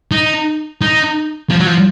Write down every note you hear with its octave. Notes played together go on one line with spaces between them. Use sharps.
D#4
D#4
F3
F#3
F3